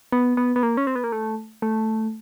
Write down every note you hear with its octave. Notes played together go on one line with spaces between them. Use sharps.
B3
B3
B3
A#3
C#4
C4
B3
A#3
A3
A3